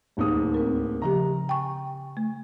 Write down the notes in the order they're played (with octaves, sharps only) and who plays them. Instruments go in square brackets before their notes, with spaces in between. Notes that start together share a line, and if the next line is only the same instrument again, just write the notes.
[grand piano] D1 D#2 D#6
[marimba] C4 A#4
[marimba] C#3 F3 G4 [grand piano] A#5
[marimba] G5 G#5 C#6
A3